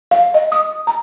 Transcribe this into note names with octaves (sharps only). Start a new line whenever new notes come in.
F5
D#5
D#6
A#5